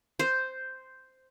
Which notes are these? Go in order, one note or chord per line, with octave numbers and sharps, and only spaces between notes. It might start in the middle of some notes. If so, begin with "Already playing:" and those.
C5